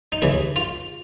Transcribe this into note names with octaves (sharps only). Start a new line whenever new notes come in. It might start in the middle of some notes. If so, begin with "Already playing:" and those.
D#4
D#2 C#3 E3 E4
F4